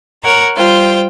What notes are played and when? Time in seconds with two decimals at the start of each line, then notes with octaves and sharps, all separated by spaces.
0.24 A#4 C#5 F#5 A#5
0.55 G3 F4 C5 G5